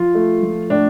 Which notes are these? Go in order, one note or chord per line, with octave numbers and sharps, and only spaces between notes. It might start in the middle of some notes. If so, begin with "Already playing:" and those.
Already playing: F3 F4
A3
F3
A2 D4